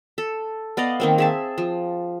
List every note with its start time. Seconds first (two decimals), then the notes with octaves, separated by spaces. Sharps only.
0.18 A4
0.77 B3 D5 D#5 F5
1.00 D#3 A#3 C4
1.18 G#4 E5 A5
1.58 F3